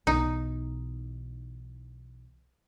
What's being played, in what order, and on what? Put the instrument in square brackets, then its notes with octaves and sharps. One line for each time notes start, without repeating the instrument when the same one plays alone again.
[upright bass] B1 E3 [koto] D#4